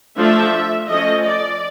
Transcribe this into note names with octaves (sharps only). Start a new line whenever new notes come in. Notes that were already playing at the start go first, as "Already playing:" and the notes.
F3 A3 D4 E5
F3 A3 C#4 D#5
D5